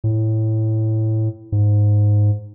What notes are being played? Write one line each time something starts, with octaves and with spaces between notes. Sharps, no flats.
A2
G#2